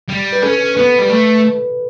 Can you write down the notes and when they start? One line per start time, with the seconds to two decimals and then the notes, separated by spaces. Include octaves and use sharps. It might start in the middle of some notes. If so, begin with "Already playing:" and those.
0.09 G3
0.33 B4
0.43 C#4 A4
0.76 B3 B4
0.99 G3
1.10 A3